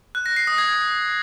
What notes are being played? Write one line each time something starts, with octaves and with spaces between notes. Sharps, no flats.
F#6
A#6
C7
D#6
G#6